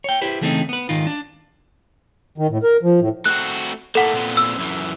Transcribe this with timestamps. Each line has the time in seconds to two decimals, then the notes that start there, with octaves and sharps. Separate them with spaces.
0.04 C#5 G5
0.21 E4 G4 B4 C5
0.41 C#3 E3 A3 C4 C#4 D#4
0.69 B3 B4
0.89 G#2 D#3 D#4 F4
1.07 D4
2.38 D#3
2.50 A2
2.63 A#4
2.83 F3
3.00 A2
3.26 A3 C4 F#4 F#6
3.95 A2 A3 A#3 A4 F#5
4.14 A#2 B3 C4
4.37 E6
4.58 F#2 E3